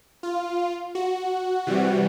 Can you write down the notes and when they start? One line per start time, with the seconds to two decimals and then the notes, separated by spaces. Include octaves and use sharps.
0.23 F4
0.95 F#4
1.67 C3 E3 G3